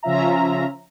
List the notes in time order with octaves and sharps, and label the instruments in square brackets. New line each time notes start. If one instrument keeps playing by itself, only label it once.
[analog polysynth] C#3 F3 C#4 F4 E5 A#5